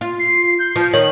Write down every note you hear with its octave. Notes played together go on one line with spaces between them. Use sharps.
F4
C7
G6
F3
D#3 C#5 F#7